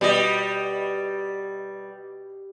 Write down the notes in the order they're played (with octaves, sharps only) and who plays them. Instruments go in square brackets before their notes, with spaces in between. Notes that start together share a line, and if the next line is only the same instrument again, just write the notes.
[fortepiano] B2 D#5 [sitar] G3